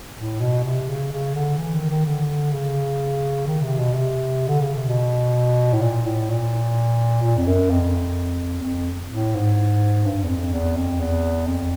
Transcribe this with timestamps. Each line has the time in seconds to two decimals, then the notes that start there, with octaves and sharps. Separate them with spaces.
0.17 A2
0.41 B2
0.64 C3
0.87 C#3
1.11 C#3
1.34 D3
1.58 E3
1.74 D#3
1.90 D#3
2.06 D3
2.52 C#3
3.47 D#3
3.62 C3
3.78 B2
3.94 C3
4.48 D3
4.61 C#3
4.75 C3
4.88 B2
5.73 A2
5.81 A#2
6.06 A2
6.30 A#2
7.23 A#2
7.38 F2
7.47 F#2
7.71 F2
8.59 E2
8.64 F2
9.11 A2
9.35 G#2
10.06 G2
10.24 E2
10.29 F2
10.53 E2
10.77 F2
11.00 E2
11.47 F2